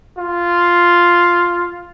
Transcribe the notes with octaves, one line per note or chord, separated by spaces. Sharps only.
F4